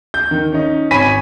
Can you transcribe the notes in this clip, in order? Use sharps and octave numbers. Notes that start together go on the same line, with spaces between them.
G6
D#3
C#4 D#4
G#1 C#5 G#5 B5 B6 D#7